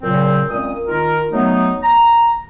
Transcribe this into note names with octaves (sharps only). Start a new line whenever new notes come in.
A#2 C#3 F#3 C4
A#2 G#3 C4 C#4 D5 D#6
D#3 F4 A#4
F#3 A3 B3 D#4
A#5